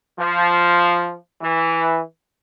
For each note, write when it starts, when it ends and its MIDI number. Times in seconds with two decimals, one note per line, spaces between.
0.18 1.15 53
1.41 2.01 52